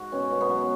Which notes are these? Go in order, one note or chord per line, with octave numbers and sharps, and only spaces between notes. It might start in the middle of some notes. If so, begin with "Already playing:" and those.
Already playing: G#2 F#4
B2 C#4
B2
B3
F#3